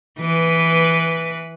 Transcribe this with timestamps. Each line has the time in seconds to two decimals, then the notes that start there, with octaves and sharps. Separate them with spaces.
0.19 E3 B4